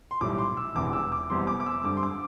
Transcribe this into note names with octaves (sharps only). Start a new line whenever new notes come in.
C6
B1 A2 E3 G3 D6
C6
E6
E1 E2 C3 E3 D6
E6
D6
F1 F2 E3 G3 B3 C6
D6
D6
E6
G2 D3 G3 C4 D6
C6
D6